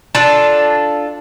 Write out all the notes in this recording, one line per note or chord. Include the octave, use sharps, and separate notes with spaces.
D4 F4 A4